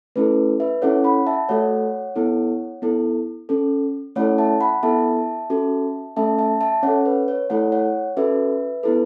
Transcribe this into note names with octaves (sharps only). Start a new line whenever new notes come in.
A3 C#4 E4 A4 B4
B4 E5
C#4 E4 A4 C#5 F#5
F#5 B5
E5 A5
A3 F#4 A4 C#5 F#5
B3 E4 A4
B3 E4 A4
C#4 A4
A3 C#4 E4 A4 C#5 F#5
E5 A5
F#5 B5
B3 E4 A4 E5 A5
C#4 F#4 A4
A3 C#4 A4 E5 A5
E5 A5
E5 A5
C#4 A4 C#5 F#5
B4
C#5
A3 E4 A4 C#5 F#5
C#5 F#5
C#4 F#4 A4 B4 E5
B3 E4 A4 B4